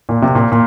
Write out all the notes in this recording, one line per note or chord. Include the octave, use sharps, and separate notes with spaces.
A#2
C3
A#2
A#2